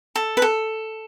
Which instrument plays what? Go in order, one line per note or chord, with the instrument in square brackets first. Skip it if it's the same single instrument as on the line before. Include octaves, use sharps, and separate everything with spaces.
[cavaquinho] A4
B4
A4